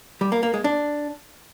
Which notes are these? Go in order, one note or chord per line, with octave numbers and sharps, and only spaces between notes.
G3
A#3
A#3
G#3
D4